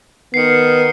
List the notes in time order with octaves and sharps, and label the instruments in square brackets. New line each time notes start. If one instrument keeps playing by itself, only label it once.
[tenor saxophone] D#3 [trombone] B3 [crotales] C7 C#7